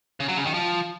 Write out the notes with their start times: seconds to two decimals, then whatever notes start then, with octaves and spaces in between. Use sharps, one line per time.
0.20 C#3
0.28 F#3
0.37 C#3
0.45 D#3
0.54 F3